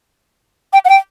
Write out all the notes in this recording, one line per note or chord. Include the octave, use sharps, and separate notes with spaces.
G5
F#5
G5